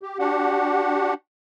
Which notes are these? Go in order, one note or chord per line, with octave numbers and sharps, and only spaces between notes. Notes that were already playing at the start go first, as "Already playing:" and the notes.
G4
D4 F#4 G4 F#5